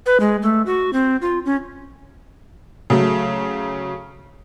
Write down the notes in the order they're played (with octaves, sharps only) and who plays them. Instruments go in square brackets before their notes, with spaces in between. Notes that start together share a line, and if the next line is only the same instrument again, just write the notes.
[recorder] B4
G#3
A3
F#4
C4
F4
C#4
[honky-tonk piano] C#3 F#3 A3